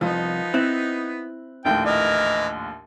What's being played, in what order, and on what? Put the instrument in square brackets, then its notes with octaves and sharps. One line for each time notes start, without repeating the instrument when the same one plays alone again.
[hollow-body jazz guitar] C2 F2 [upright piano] F3 [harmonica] B3 D#4
[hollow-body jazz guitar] C4 E4 [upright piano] F#6
[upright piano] A#1 D#2 A2 [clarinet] G5
[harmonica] E3 A#4 [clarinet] D#5